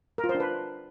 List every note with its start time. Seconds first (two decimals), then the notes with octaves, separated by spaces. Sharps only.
0.18 A#4
0.24 F4
0.29 C5
0.35 D4
0.40 B4